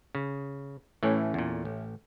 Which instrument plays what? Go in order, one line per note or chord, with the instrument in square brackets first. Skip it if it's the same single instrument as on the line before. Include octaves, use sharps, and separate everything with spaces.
[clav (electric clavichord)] C#3
[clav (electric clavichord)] A2 E3 [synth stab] A3 C#4
[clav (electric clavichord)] E2 A#2
A1